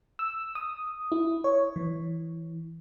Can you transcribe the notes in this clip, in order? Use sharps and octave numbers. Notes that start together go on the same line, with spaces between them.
E6
D#6
E4
C#5
E3